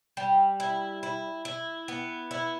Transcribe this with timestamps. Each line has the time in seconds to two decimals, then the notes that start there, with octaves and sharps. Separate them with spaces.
0.17 G3
0.60 E4
1.03 E4
1.45 E4
1.88 B3
2.31 E4